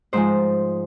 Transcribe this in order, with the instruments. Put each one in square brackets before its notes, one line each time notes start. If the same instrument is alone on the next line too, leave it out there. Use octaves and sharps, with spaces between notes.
[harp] G#2 F3 G#3 C5